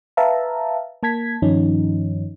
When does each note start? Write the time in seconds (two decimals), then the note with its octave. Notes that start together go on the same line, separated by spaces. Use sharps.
0.17 B4 E5 F5 A5 A#5
1.03 A#3 A5 G#6 B6
1.42 G2 D#3 F3 C#4 D#4